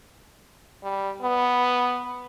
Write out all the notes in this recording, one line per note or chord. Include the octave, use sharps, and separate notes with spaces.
G3
B3